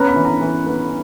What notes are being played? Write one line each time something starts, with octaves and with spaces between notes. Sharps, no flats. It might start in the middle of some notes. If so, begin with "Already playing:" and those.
Already playing: B3 C#4 A#5
B5
E3
A#5
E3
B3